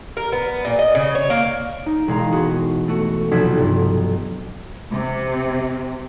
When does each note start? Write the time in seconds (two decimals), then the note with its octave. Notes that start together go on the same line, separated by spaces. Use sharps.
0.17 A#4
0.32 B3
0.65 A#2
0.79 D#5
0.95 C#3
1.15 C#5
1.30 A#3
1.86 D#4
2.08 E1 G#3 F5 A#5
2.32 B3 F#4 G#4
2.88 A3 F#4
3.31 F1 B1 B3 A4 G#6 B6
3.58 G2
4.91 C3